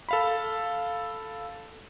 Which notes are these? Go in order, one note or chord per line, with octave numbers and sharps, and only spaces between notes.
A4 F5 B5